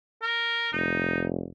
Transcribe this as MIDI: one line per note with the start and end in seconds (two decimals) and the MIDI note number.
0.22 0.69 70
0.73 1.48 29
0.73 1.25 63